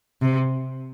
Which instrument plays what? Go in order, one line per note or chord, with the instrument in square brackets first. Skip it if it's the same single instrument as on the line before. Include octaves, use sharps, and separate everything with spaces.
[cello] C3